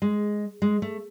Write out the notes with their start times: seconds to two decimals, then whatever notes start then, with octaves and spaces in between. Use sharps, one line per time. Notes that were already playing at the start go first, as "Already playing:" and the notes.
0.02 G#3
0.62 G#3
0.82 A3